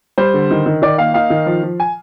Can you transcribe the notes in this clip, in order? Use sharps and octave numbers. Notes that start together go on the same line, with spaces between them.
G3 C5
D3
D#3
D#3
D#3 D5
A#3 F5
D#4 F5
D#3
F3
F3
G#5